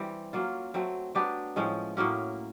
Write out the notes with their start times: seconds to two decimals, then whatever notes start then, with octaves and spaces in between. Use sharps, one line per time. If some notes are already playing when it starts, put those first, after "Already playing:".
Already playing: E3 G3 C4
0.33 F#3 A#3 C#4 F4
0.74 F#3 A3 C4
1.15 F#3 B3 D4 G4
1.56 A2 F3 G#3 C#4
1.97 A2 F#3 A#3 C#4